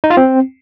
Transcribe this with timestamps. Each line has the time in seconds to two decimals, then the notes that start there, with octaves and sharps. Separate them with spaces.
0.04 D#4
0.10 F4
0.17 C4